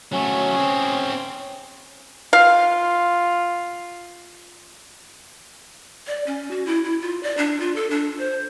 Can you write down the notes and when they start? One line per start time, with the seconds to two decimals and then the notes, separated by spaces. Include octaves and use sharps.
0.13 F#3 A3 C#4
0.55 C4 G#4
2.33 F4 F5
6.07 D5
6.27 C#4
6.51 F#4
6.66 E4
6.84 E4
7.02 F4
7.23 D5
7.37 D4
7.60 F4
7.76 A4
7.90 D4
8.19 C5